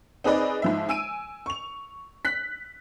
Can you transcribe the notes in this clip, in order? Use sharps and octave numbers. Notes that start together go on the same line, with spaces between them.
C4 D#4 G#4 B4 D5 D#5
G#2 F3 E5
G#5 E6 D7 D#7
C#6 F7
F#6 B6